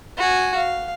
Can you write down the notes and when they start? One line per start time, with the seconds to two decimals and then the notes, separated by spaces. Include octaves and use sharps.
0.18 F#4 G#5
0.56 F5